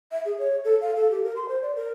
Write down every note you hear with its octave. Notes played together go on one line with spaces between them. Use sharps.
E5
G#4
C#5
A4
F5
A4
G4
A#4
C6
C5
D5
A#4